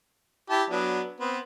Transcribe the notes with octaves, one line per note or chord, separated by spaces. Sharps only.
E4 G4 A5
F#3 B3 D4
B3 C4